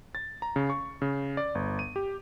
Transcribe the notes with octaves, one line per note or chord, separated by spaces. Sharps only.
A6
A#5
C#3
C#6
C#3
D5
G1
D#7
G4